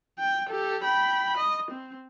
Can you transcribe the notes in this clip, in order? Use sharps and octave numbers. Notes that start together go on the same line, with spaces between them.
G5
G4 A4
G5 B5
D#5
C4